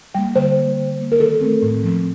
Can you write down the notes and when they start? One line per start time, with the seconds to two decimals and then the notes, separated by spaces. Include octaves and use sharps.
0.15 G3 A#3 G5
0.36 D3 C5
0.57 G3 A#3
0.78 D3
0.99 G3 A#3
1.12 A#4
1.20 D#3 A4
1.41 A3 C4
1.63 A2
1.83 F3 C4